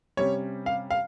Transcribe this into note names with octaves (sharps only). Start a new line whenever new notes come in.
C3 G3 C#4 C#5
F5
F5